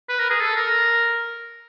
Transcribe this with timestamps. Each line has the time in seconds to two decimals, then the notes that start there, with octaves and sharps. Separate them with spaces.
0.09 B4
0.19 A#4
0.30 G#4
0.41 A4
0.56 A#4